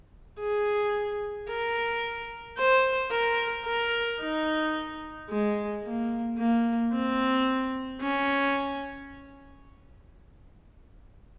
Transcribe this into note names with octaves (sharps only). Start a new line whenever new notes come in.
G#4
A#4
C5
A#4
A#4
D#4
G#3
A#3
A#3
C4
C#4